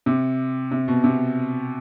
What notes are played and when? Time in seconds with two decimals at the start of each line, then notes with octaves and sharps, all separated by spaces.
0.06 C3
0.71 C3
0.88 B2
1.04 C3